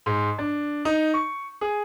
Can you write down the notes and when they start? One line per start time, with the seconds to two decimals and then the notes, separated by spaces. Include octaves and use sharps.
0.06 G#2
0.38 D4
0.85 D#4
1.14 C#6
1.61 G#4